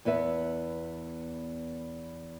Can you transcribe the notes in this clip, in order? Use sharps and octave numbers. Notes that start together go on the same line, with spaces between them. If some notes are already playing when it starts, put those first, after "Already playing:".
E2 B3 B4 E5